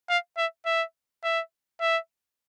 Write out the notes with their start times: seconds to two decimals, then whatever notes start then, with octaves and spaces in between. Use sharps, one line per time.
0.09 F5
0.37 E5
0.66 E5
1.23 E5
1.80 E5